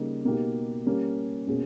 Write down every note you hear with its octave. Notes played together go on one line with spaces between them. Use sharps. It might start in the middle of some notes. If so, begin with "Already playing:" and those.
Already playing: C#3 G3 A#3 D#4
B2 A#3 D#4 G4
G3 A#3 C#4
B2 A#3 C#4 G#4